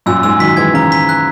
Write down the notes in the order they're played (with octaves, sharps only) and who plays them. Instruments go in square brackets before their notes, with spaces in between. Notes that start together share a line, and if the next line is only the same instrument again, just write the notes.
[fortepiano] F#2 A#2 [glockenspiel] E6
[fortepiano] G#2 [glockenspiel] E6
[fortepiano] D#3 F#3 [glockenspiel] B6
[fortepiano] E3 G#3 [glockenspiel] G#6
[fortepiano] C#3 E3 [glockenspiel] A#5
[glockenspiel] B6
F#6